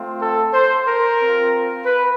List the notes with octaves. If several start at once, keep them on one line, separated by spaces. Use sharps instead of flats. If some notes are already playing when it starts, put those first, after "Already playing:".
Already playing: A3 C4 F4
A4
C5
A#4
C4 F4
B4